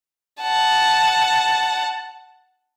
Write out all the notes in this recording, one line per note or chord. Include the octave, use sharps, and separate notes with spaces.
F#5 A5